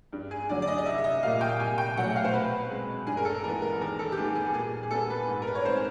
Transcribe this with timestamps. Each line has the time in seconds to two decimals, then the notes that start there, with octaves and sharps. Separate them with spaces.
0.13 G2
0.31 G#4
0.49 D3 F#3 D5
0.62 D5
0.67 D#5
0.78 D#5
0.86 C2 E5
0.98 E5
1.04 D#5
1.23 A#2 G3 A#3 F5
1.41 G5
1.60 C2 G#5
1.78 G5
1.96 B2 F#3 A3 F#5
2.16 F5
2.24 C5
2.33 B2 B4
2.70 G#3 C4
3.07 G2 G#4
3.17 A#4
3.25 A4
3.44 E3 G#3 B3 A#4
3.62 A#4
3.81 D#2 A#4
3.99 A4
4.12 G4
4.17 D#3 G3 B3 G#4
4.35 G#4
4.54 A#2 G#4
4.83 G#4
4.91 G3 B3 A4
5.10 B4
5.28 G#2
5.42 A#4
5.47 B4
5.55 C#5
5.65 D#3 G#3 C4 C5